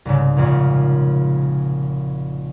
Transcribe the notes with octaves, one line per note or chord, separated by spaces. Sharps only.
C2 G#2 C#3
G#1 F2 A#2